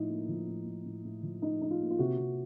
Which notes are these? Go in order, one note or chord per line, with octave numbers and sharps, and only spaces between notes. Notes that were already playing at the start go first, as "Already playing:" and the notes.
Already playing: A2 F3 D#4
A#3
F3
A2
A2
A2
A2
F3
A2 D#4
A2 D#4
F4
A#3
F4
C3 F#4
C3